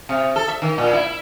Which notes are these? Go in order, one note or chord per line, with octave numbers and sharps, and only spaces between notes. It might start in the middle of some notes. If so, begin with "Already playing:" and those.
C3
A4
E5
D#3
A#2
E4